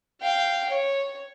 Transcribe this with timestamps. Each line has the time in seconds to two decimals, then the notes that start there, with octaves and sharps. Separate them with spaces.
0.21 F5 G5
0.69 C#5